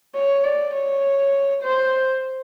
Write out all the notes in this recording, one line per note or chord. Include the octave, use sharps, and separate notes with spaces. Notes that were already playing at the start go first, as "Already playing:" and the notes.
C#5
D5
C#5
C5